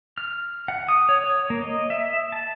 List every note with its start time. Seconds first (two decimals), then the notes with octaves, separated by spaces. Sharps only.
0.18 F6
0.68 F#5
0.89 D#6
1.09 C#5
1.24 C#5
1.50 A#3
1.62 D#5
1.90 E5
2.32 A5